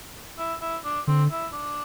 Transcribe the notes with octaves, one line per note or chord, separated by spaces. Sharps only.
E4
E4
D4
D3 C4
E4
D4